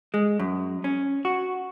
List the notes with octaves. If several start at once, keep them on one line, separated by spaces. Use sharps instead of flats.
G#3
F#2
C#4
F#4